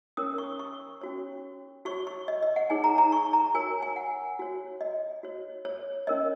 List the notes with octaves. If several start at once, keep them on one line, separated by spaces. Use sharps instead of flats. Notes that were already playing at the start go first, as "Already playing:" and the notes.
C#4 A#4 C#5 D#6
C#6
C#6
C#4 F#4 C#5
F#4 C#5 C#6
C#6
D#5
D#5
F#5
D#4 G#4 C#5 G#5
A#5
A#5
C#6
A#5
F#4 A#4 C#5 G#5
G#5
F#5
F#4 C#5
D#5
F#4 C#5
C#5
C#4 A#4 C#5 D#5